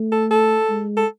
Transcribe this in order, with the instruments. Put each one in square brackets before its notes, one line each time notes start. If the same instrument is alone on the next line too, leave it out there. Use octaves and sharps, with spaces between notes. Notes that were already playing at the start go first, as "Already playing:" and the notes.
Already playing: [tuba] A3
[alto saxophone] A4
A4
[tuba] G#3
[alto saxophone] A4